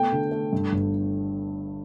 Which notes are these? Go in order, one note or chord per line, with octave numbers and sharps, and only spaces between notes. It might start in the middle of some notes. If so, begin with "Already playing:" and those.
Already playing: A3 B3 G5
D3
A3
G2
G1